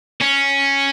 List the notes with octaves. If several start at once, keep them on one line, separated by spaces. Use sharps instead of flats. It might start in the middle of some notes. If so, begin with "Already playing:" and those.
C#4